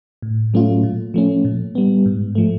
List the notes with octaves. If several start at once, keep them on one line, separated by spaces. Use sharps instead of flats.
A2
F#3 A3 C#4 F4
A#2
F3 A3 C#4
A#2
G3 B3
G#2
F3 A3